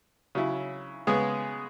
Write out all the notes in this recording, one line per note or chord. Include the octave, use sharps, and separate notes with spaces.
C#3 F#3 E4
C#3 G#3 B3 G#4